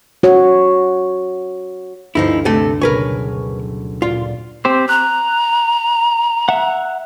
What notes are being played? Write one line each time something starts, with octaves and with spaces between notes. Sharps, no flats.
F#4 C#5
D2 G2 F3 D#4 E4 B4
C3 A3 A4
F#1 B2 A#4 B4 C#5 G#5
A#2 F4 D5
C4 G4 C5
A#5 F#6
E5 F#5